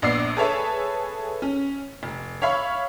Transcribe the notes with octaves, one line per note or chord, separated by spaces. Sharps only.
A#1 B3 D4 D5 E6 C7
G#4 A4 B4 C#5 E5 A5
C#4
F1
C#5 E5 F5 B5 C#6